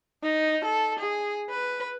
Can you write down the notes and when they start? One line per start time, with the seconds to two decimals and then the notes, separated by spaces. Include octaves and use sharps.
0.23 D#4
0.64 A4
0.99 G#4
1.50 B4